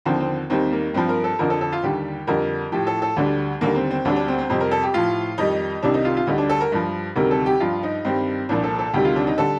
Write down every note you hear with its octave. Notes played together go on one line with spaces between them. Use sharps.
D#2 D3 F3 C4
C4
D#2 D#3 G3 C4
A#3
G2 F3 C4
A#4
A4
F2 D3 F3 A#4
A4
A4
F4
D#2 D3 G3 G4
F2 D3 G3 A#4
A2 F3 G4
A4
A4
D2 D3 G3 D4
D#2 D3 G3 A#3
C4
C4
D2 D3 G3 D4
D4
C4
C4
F2 C3 G3 C4
A#4
A4
G4
A2 F3 F4
F2 D#3 G3 D#4
C2 C3 D#3 G3 D4
D#4
F4
F4
D2 D3 G3 D#4
D4
A4
A#4
G2 F3
D2 C3 D#3 G3 A#4
A4
G4
G2 F3 F4
D#4
G2 D#3 G3 C4
C2 A#2 F3 D4
A4
A4
D2 C3 D#3 G3 G4
F4
D4
D#4
D3 G3 A4